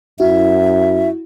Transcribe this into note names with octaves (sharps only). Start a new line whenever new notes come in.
F#2 E4 F#4 E5